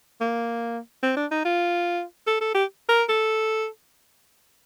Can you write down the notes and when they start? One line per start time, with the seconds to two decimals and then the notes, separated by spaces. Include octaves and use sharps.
0.21 A#3
1.03 C4
1.17 D4
1.31 D#4
1.45 F4
2.27 A4
2.41 A4
2.54 G4
2.89 A#4
3.09 A4